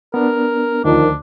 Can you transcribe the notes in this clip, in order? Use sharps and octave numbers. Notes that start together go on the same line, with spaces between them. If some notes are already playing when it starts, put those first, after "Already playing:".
B3 D4 A#4
D2 D#3 F3 D4